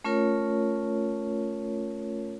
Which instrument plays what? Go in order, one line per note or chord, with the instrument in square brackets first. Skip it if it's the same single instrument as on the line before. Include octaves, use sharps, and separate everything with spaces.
[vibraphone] A3 C#4 F4 A#4 C#5